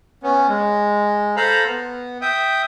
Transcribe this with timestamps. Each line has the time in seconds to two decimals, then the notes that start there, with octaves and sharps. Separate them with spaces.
0.23 B3 C#4
0.48 G#3
1.36 A4 C5 F5 A#5 B5
1.66 B3
2.21 E5 G5 D#6